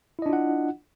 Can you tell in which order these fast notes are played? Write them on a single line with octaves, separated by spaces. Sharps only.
E4 D#5 D4 F4 F#5